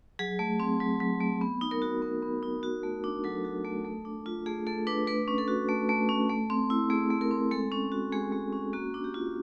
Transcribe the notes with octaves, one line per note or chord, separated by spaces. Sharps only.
F#3 G#4
A3
C4
F#3
F#3
A3
B3
D#4
A#4
F#4
B3
B3
D#4
F#4
A3
D4
F#3 A4
F#4
A3
A3
D4
F4
A3 G#4
A3 A4
D4 B4
A3 B4
C#4
A4
F#4
A3
A3
C#4
A3
C4
E4
A3 G#4
A3
A#4
C4
G#3 A4
C#4
F#4
G#3 G#4
G#3
C#4
A#3 F#4
D4
G4
F4